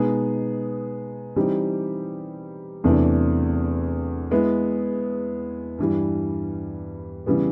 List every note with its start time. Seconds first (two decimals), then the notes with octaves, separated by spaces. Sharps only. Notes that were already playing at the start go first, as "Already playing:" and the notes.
Already playing: B2 G#3 B3 D#4 G#4
1.36 E3 G3 C4 D#4 G4
2.84 E2 C3 E3 A3 D4
4.31 G#3 B3 E4
5.79 G2 E3 G3
7.26 C#3 E3 G3 B3